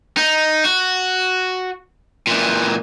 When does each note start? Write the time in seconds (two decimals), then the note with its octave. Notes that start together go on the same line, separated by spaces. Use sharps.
0.17 D#4
0.65 F#4
2.27 A#2 E3